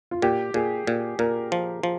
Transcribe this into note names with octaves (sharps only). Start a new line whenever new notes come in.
F4
A#2 G4
A#2 G#4
A#2
A#2 A#4
F3
F3